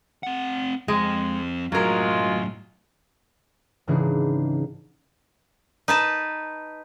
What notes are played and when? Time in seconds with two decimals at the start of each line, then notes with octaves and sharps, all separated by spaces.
0.23 C4 F#5
0.88 F2 G#3 C4
1.72 F#2 A2 F#3 G#3 F4 A#4
3.87 G#2 C#3 E3 D4 D#4 G#4
5.88 D#4 B4 A5